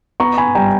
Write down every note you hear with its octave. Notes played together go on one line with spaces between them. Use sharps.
B3 A#5 C#6
G#5 B5
G3 G5 A#5